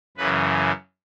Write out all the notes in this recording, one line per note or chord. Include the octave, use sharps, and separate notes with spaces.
F#2 C#3 E3 B4